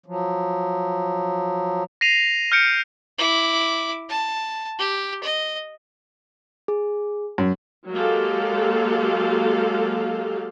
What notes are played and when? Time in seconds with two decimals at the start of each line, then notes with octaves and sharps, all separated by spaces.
0.06 F3 F#3
2.01 A#6 C7 D#7 F7
2.52 F6 G6 C#7 D7
3.18 E4 D6
4.09 A5
4.79 G4
5.23 D#5
6.68 G#4
7.38 F#2
7.92 F#3 G#3 A#3 G4 A4 F5